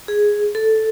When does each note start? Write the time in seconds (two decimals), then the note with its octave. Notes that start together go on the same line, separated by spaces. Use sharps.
0.08 G#4
0.55 A4